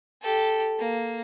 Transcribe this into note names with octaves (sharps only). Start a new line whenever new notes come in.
G4 A4
A#3